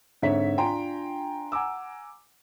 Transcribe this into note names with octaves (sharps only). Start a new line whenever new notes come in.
G#2 D3 C4 C#5 E5 B6
D4 F4 G5 G#5 A#5 C6
F#5 G#5 A#5 D6 E6